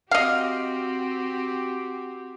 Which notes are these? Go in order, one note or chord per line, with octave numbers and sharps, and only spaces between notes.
C4 F#4 G4 D#5 F5